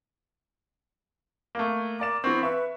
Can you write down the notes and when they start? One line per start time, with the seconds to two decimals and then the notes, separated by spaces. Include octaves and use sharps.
1.55 A3 A#3
2.00 A#4 D5 D6 E7
2.24 E3 B3 C4 C#6
2.43 B4 E5 C#6